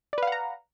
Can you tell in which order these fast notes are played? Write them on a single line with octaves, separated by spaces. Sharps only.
D5 B4 F5 F#5 A#5